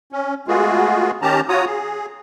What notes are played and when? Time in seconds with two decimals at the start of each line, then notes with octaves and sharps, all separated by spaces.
0.12 C#4
0.48 G#3 A3 B3 F4 F#4 G#4
1.22 D#3 C#4 G4 A5 A#5
1.49 F4 F#4 C#5 A#5 D#6
1.66 G#4